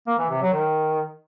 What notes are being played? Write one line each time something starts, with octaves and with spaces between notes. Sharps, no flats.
A#3
E3
C3
F#3
D#3